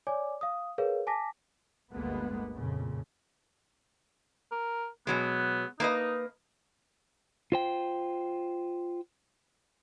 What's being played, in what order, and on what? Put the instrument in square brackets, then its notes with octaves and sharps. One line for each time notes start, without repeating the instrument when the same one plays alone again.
[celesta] C#5 D5 G#5 D6
F5 D#6
G#4 A#4 B4 C#5 F5
G#5 A5 D6 A#6 B6
[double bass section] G1 D2 G2 G#3 A#3 B3
F2 A#2 C#3
[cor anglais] A#4
[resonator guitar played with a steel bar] B2 F#3 G#3 [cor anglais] B3
[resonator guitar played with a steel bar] A#3 B4 D#5 [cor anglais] D#4
[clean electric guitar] F4 C5 G5